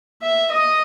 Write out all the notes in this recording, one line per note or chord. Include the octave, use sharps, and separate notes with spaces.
E5
D#5